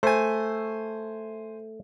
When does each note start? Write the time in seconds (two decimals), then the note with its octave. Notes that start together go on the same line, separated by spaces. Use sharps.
0.03 A3 C5 G#5